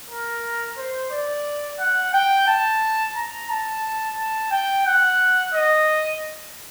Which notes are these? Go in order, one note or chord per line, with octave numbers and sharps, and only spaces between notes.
A#4
C5
D5
F#5
G5
A5
A#5
A5
A5
G5
F#5
D#5